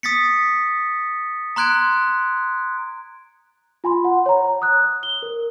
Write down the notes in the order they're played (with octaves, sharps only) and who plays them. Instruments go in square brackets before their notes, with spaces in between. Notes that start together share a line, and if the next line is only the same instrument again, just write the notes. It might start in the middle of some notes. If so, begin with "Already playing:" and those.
[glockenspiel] D#6 A6 B6 C#7
A#5 C6 F#6 G#6 D7
[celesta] F4 G#5 B5 C6
F#5
C#5 A#5
D#6 F#6
G7
A#4